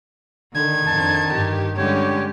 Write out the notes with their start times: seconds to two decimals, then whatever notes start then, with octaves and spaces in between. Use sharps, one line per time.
0.56 D3 D#3 G#6
0.86 F2 D3 A5
1.34 G2 G4
1.77 D3 G3 G#3 C#4 G4 C#5